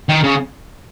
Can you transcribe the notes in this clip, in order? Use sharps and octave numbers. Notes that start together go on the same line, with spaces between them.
D#3
C#3